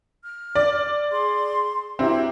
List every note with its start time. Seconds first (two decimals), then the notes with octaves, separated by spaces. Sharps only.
0.22 F6
0.55 D5
1.12 G#4 C6
1.99 C4 E4 F#4 G4 A#4